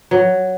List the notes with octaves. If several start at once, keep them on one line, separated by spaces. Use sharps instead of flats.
F#3